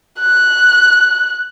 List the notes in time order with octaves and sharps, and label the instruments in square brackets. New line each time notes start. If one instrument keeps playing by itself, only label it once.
[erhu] F#6